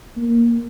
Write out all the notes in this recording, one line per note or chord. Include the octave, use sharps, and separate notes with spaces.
A#3